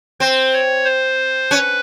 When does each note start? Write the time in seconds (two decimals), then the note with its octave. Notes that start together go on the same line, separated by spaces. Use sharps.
0.20 C4 C5
0.53 C#5
0.85 C5
1.51 C#4 B4